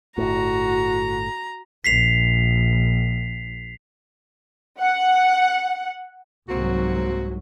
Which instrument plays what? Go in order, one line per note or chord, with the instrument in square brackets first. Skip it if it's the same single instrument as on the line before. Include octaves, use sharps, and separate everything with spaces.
[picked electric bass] G1 A2 [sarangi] F#4 [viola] A#5
[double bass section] A#1 [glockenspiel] B6 C7 F7
[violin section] F#5
[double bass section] C2 G#2 F#3 [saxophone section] A#3 C4 F#4